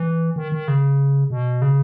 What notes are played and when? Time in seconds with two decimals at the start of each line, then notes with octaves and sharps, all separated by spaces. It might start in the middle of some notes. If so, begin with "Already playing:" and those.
Already playing: E3
0.36 D#3
0.52 D#3
0.68 C#3
1.30 B2
1.62 C#3